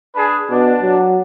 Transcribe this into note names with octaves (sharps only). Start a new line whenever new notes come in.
D4 G#4 B4
B2 D4
F#3